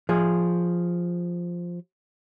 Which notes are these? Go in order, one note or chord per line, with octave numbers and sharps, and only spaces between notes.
F3 G#4